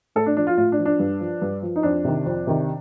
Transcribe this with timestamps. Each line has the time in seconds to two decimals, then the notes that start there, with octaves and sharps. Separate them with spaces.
0.16 A2 A4
0.26 D4
0.37 F3 D4
0.47 F4
0.57 A2 F4
0.72 D4
0.78 F3
0.85 D4
0.99 G2
1.21 F3
1.42 G2
1.62 F3
1.76 D#4
1.83 F2 D4
2.04 C3 D#3
2.26 F2
2.47 C3 D#3